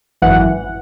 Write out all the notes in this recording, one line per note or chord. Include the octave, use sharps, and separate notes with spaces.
G#1 F#2 E3 F#5